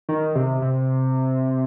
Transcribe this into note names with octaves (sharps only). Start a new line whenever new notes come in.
D#3
C3
C3